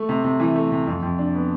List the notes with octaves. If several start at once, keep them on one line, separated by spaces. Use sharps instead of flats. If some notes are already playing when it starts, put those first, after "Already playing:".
Already playing: A3
C3
C3
E3
A3
C3
F2
F2
D4
B3